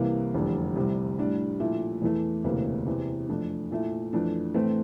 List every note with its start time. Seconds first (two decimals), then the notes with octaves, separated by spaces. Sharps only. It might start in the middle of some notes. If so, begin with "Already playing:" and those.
Already playing: C2 C3 E3 A#3
0.34 F1 E2 D3 G3
0.76 C2 C3 G3
1.19 A2 G3 D4
1.60 A#2 F3 A3 E4
2.02 E2 E3 A3
2.44 E1 D2 C3 E3 A#3
2.87 E2 C3 E3
3.29 F2 E3 A3 D4
3.71 A#2 A3 E4
4.13 F2 E3 A3 D4
4.54 A2 E3 A3 C4